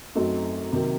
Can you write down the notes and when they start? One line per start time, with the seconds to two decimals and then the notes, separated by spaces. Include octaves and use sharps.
0.15 F#2 F#3 A3 C4 D#4
0.72 C3 D#3 F#3 A#3